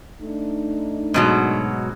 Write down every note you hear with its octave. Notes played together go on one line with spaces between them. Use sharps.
A3 D4 D#4
G#2 B2 F#3